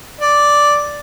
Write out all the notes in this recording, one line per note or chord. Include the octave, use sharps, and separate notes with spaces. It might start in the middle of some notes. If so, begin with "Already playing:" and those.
D5